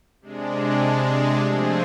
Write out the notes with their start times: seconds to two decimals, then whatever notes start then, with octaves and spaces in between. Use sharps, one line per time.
0.21 C3 G#3 D4
1.38 F3 A3 C4 G#4